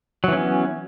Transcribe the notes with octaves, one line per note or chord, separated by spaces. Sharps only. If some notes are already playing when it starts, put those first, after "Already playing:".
E3 F#3 B3 C#4